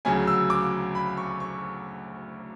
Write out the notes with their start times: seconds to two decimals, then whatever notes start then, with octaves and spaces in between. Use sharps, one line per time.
0.05 D2 C#3 F#3 G#5
0.27 E6
0.50 D6
0.95 B5
1.17 C#6
1.40 C#6